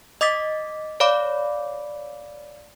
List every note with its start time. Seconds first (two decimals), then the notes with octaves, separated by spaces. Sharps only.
0.21 D#5 D6 D#6 A6 B6
1.00 C#5 D5 F5 B5 D6